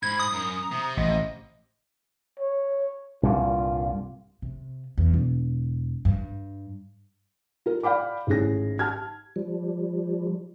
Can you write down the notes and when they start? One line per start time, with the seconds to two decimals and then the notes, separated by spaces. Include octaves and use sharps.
0.03 G#2 B5 G#6
0.20 D#6
0.33 F#2 A#5
0.72 C3
0.97 A1 D#5
2.40 C#5
3.23 C2 G2 A#2 F4
4.42 C3
4.98 E2
5.14 E1
6.05 G2
7.66 F4 A#4
7.83 D5 F5 G5 B5 D6
8.27 G#1 A2 C#4 G#4 A#6
8.79 A5 F6 G#6
9.36 F3 G3